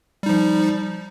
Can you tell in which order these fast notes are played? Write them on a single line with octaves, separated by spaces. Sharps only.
G3 D#4 F3